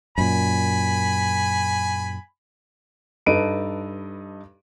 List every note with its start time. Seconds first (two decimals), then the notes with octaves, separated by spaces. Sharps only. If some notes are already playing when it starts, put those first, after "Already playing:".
0.18 F#2 A#2 G#5 B5
3.26 G2 D#4 A4 B4 D7 D#7